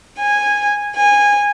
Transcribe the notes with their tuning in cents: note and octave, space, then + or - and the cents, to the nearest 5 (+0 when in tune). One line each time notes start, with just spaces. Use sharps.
G#5 -10
G#5 -20